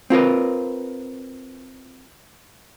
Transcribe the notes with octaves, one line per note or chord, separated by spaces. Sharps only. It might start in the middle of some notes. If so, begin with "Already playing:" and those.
C4 F4 A#4 B4